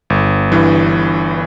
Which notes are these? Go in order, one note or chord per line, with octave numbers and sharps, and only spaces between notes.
G1
G2 E3